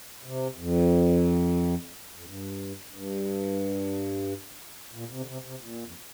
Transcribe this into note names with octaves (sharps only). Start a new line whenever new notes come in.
C3
F2
F2
G2
G2
A#2
C3
D3
C3
C3
A#2
F2